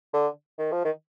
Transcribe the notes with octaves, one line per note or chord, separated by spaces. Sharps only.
D3
D#3
F3
D#3